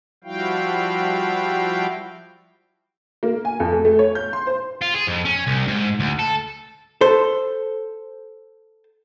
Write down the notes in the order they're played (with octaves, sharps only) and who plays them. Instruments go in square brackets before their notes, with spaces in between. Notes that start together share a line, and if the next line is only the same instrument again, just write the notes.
[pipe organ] F3 G3 E4 F#4 F5 G5
[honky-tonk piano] A#3
G#5
F2
A3
A3
C#5
G6
C6
C5
[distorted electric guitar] F4
G#4
F2
C#4
C2
G#2
D2
A4
[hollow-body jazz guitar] A4 C5